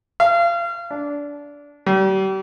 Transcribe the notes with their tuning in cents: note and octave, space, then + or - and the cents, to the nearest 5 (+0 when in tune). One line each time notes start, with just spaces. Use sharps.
F5 -30
D4 -20
G3 -40